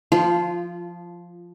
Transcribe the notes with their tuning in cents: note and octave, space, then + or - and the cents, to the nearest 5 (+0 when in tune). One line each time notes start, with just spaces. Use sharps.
F3 +0 F4 -20